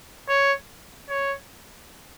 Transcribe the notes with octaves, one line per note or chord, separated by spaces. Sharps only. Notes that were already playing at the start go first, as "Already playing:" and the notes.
C#5
C#5